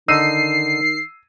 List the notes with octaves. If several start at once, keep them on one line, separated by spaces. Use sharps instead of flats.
D3 D#3 D#4 E6 C7 D#7